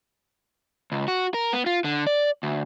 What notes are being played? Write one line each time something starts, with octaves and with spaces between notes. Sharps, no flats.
C#2
F#4
A#4
B3
F4
D3
D5
D2